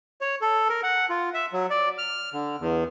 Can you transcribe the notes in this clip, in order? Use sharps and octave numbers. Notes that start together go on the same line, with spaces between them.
C#5
A4
A#4
F#5
F4
E5
F#3
D5
F6
D3
E2